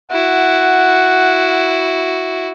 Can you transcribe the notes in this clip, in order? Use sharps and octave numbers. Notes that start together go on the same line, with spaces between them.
E4 F#4 F#5